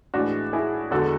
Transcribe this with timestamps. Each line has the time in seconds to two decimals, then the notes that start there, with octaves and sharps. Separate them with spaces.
0.14 A2 E3 G#3 D4 F#4
0.53 E4 G#4
0.91 E2 D3 G#3 F#4 A4